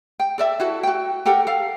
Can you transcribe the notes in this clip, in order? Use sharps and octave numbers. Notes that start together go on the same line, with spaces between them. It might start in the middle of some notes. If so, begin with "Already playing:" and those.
G5
A4 D5 E5
E4 F#4 A4
F#4 G5
G4 A4 A#4 F#5
A4 F5